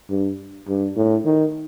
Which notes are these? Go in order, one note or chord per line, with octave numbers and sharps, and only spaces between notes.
G2
G2
A2
D#3